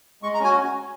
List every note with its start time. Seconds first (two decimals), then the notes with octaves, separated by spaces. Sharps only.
0.22 G#3 C#6
0.34 A#5
0.39 C#4 F#4 G#5